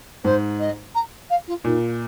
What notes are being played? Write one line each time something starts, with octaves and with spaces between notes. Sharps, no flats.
G#2 C5
D#5
A#5
F5
F4
A#2 D#4